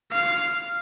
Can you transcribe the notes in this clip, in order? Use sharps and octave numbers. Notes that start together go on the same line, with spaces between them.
F5